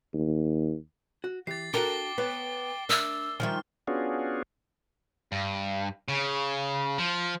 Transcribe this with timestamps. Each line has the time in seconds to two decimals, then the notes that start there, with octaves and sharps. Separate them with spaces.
0.14 D#2
1.24 F#4
1.47 E3 G4 A6 C7
1.74 D4 F#4 A4 A#4 G5 D6 G7
2.18 B3 B4 C#5 A5
2.89 D4 A#4 D5 E5 E6
3.40 D#3 F3 G3 E5 G#5 F6
3.88 B3 C#4 D4 F4 F#4 G#4
5.32 G2
6.09 C#3
6.99 F3